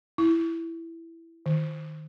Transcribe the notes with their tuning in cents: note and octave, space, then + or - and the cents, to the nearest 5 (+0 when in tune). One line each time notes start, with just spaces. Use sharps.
E4 +5
D#3 -5